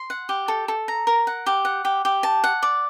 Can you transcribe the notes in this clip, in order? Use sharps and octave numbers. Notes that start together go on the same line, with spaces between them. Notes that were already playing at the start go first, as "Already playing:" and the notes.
Already playing: C6
F#5
G4
A4
A4
A#5
A#4
F#5
G4
F#5
G4
G4
A5
F#5
D5